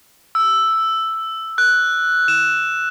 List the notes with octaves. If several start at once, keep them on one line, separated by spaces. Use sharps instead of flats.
E6
F#6
E7